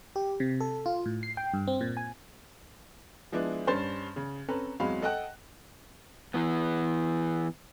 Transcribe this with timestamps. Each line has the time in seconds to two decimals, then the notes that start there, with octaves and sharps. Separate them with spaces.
0.16 G4
0.40 C3
0.60 A4
0.86 F4
1.06 A2
1.23 C7
1.37 G5
1.54 G2
1.67 C4
1.81 A#2
1.97 G#5
3.32 F3 G#3 B3 D4 E4
3.67 G2 C#4 C5 C6 A6
4.16 C#3
4.48 C4 C#4 A4 B4 A#5
4.80 E2 F#3 G#3 C4 F5 B5
5.02 A4 D#5 F#5 G5 F#6
6.34 E3 B3